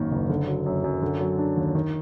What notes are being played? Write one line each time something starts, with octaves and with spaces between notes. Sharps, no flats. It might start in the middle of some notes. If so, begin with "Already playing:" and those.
Already playing: G#1 F#2 D#3 A#3
F#1
D3
F#3
F#2
F#2
D3
F#3
D4
D#2
D#3